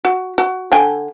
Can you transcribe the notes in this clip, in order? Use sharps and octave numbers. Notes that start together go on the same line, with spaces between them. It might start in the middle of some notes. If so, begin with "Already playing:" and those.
F#4
F#4
D3 G5 G#5